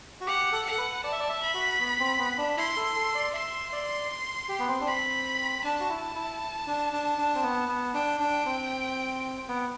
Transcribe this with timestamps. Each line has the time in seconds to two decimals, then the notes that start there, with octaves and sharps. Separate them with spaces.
0.21 F#4
0.27 G4 F#5
0.52 A4
0.65 F#5
0.71 A4
0.78 B4
1.03 D5 A5
1.12 E5
1.20 D5
1.29 E5
1.42 B5
1.54 F#4
1.80 B3
2.00 C4
2.19 B3
2.38 D4
2.57 E4 C6
2.76 A4
2.96 A4
3.15 D5
3.33 E5 C6
3.73 D5
4.49 G4
4.59 B3
4.68 C4
4.81 D4
4.87 C4 B5
5.64 D4 A5
5.80 F#4
5.89 E4
6.15 E4
6.67 D4
6.93 D4
7.18 D4
7.35 C4
7.43 B3
7.69 B3
7.95 D4 G5
8.20 D4
8.46 C4
9.48 B3